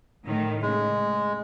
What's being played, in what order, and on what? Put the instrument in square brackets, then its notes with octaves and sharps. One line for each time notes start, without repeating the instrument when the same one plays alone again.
[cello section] A2 D#3
[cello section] C#3 [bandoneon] G#3